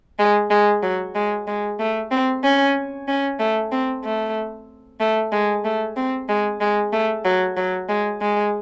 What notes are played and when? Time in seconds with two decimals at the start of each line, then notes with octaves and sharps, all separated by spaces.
0.19 G#3
0.50 G#3
0.83 F#3
1.15 G#3
1.48 G#3
1.80 A3
2.11 C4
2.44 C#4
3.08 C#4
3.39 A3
3.72 C4
4.04 A3
5.00 A3
5.32 G#3
5.65 A3
5.97 C4
6.29 G#3
6.61 G#3
6.93 A3
7.25 F#3
7.57 F#3
7.89 G#3
8.21 G#3